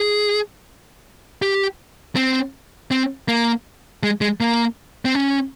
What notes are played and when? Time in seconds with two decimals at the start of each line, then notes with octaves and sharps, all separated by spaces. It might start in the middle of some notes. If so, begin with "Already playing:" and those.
Already playing: G#4
1.42 G4
2.16 C4
2.91 C4
3.28 A#3
4.03 G#3
4.21 G#3
4.41 A#3
5.05 C4
5.15 C#4